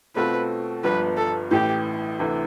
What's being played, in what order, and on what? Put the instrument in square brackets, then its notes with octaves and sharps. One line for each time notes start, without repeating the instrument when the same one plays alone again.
[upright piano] B2 A3 C4 F4 [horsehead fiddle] B4
[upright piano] G1 G2 F3 B3 [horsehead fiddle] B4
[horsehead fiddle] A4
[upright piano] A1 A2 E3 [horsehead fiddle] G4
[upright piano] D2 C3 E3